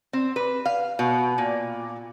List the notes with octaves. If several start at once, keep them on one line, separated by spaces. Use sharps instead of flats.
C4
B4
F5
B2
A#2